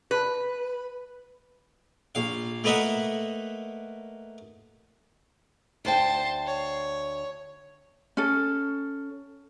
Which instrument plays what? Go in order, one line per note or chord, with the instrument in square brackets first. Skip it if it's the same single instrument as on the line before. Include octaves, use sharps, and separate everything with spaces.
[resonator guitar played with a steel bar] B4
[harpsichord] A#1 F5
A3 A#3 B4 D#5 E5 F#5
[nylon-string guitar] D2 G5 [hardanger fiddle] C5 A5
[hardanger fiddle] C#5
[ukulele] C#4 A4